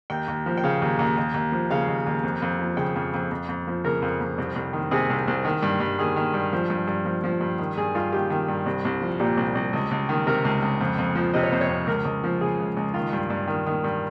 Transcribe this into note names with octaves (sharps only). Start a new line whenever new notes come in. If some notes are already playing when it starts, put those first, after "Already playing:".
D#2 G5
D#2
F3
G5
C#3 F5
D#2
D#2
D#2
D#2
F3
C#3 F5
D#2
D#2
F2
F2
F3
C#3 G5
F2
F2
F2
F2
F3
C#3 A#4
F2
F2
C2
C2
D#3
C3 G#4
C2
C2
D#3
G2
G2
D#3 G#4
D#3
G2
F3
G2
G2
F3
F3
G2
D#3
G2 G#4
G2 F4
D#3 G4
D#3
G2
C2
C2
F3
A#2 G4
C2
C2
C#2
C#2
D#3
C3 A#4
C#2
C#2
F2
F2
F3
C3 D#5
C#5
F2 C5
C#5
F2
C#2 A#4
C#2
F3
C#3 G#4
C#2
C#2
D#3 F4
G2
G2
D#3
D#3
G2